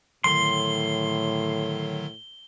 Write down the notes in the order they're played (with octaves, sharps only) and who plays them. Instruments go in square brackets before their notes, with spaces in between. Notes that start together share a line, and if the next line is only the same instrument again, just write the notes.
[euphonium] A2 [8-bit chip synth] D3 D#3 F#3 [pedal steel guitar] C6 [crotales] G7